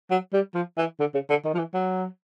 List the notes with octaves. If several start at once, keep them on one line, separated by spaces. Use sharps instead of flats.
F#3
G3
F3
E3
D3
C#3
D3
D#3
F3
E3
F#3